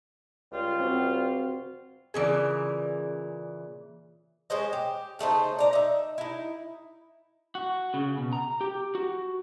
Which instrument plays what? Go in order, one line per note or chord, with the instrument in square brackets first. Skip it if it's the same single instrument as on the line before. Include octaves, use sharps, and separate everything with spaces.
[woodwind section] C#2 G3 F4
[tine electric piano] C4 F#4
[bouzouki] A#2 C#3 E3 [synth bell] G#4 D5
[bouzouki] G#3 C#4 C5 D#5
G4
C#3 A3 D#4 C5
D5 A#5
D#4 E5
D#4 E4
[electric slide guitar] F#4
C#3
B2
A#5
G4
F#4